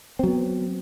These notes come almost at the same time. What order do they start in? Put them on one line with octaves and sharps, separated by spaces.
C4 F#3 B3